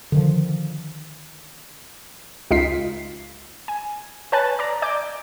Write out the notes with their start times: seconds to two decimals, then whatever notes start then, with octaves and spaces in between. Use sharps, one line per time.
0.12 D3 D#3 F3
2.51 C#2 D#4 F4 B6 C7
3.68 G#5
4.32 B4 C#5 G#5 A5 F#6 A6
4.59 D5 A#5
4.82 D5 G#5 D6 G6